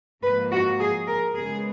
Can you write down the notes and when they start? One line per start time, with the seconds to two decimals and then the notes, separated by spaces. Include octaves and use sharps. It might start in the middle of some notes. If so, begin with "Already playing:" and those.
0.23 G#2 F3 A#3 B4
0.51 F#4
0.79 G#4
1.07 A#4
1.35 C#3 G#3 B3 G#4